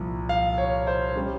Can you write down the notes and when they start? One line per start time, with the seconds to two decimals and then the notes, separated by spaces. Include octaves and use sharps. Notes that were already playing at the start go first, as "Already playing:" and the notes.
Already playing: C2 A#2 F3
0.29 F5
0.58 C#5
0.87 C5
1.15 G3 C#4